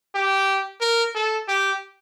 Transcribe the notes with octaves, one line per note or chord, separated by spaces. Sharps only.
G4
A#4
A4
G4